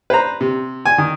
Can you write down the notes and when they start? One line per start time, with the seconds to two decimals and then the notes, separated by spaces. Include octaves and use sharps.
0.10 B4 C5 A#5
0.41 C3
0.85 G#5
0.98 D#3